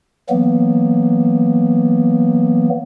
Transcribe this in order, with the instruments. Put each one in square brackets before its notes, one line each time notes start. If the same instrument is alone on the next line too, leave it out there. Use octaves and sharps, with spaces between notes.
[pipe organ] E3 F#3 A#3 B3